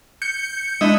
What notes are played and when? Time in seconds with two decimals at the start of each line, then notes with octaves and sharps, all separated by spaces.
0.22 G6 C#7
0.81 G#3 D4 E4 D#5